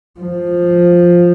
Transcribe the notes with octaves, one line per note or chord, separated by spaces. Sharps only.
F3